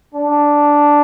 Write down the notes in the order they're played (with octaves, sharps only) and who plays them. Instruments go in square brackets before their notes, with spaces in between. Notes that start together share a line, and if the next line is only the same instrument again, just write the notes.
[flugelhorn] D4